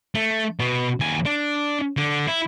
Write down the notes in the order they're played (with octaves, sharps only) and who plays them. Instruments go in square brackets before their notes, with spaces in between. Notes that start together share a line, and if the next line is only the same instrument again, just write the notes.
[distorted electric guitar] A3
B2
D#2 G#5
D4
D3
E4